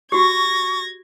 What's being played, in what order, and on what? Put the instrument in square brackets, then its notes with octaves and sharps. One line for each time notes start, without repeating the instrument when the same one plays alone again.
[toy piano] F#4 G4 [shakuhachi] C#6 [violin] G#6 A#6